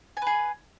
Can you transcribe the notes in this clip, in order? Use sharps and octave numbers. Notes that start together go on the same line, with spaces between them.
G#4 B4 G#5